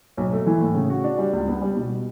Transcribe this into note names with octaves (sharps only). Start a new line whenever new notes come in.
B1
A3
E3
A2
C#3
F#4
D4
G3
C#2
B3
G3
B2